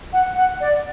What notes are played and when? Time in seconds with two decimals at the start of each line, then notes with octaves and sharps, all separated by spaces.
0.13 F#5
0.37 F#5
0.60 D5